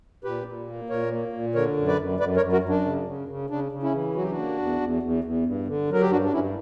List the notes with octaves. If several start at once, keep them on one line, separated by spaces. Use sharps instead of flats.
A#2 G4 B4
A#2
A#3
A#2 A#4 C#5
A#3
A#2
D3 A#4 C#5
F#2
B4 D5
F#2
F#2 B4 D5
A#4 C#5
F#2
F#4 A#4
F#2
D4
C#3
C#3
C#3
C#3 D4
C#3
C#4 E4
E3
F#3 F#4
G4
D4 F#4
A#3
E2
E2
E2
E2
G2
D3
F#3 A#4
G4
G2 D4 F#4
D4
G2 C#4 E4